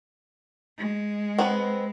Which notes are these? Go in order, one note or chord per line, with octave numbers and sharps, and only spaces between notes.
G#3
B3 C4